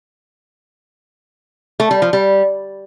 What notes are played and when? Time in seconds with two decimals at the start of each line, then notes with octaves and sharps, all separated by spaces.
1.80 A3
1.91 G3
2.02 F3
2.13 G3